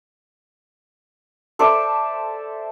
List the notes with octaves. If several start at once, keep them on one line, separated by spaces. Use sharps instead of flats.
A4 C5 D5 E5